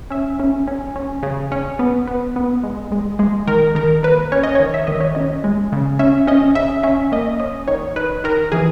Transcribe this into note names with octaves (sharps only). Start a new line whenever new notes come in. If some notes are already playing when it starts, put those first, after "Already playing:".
C#4 E5
C#4
C#4
C#4
C#3
C#4
B3
B3
B3
G#3
G#3
G#3
D#3 A#4
D#3 A#4
A#3 B4
C#4 C#5
D#5
D#3 C#5
E5
D#3 D#5
C#5
C#4 D#5
G#3
C#3
C#4 E5
C#4 D#5
C#3 E5
C#4 E5
A#3 D#5
C#4 D#5
D#3 C#5
D#3 B4
D#3 A#4
E3 G#4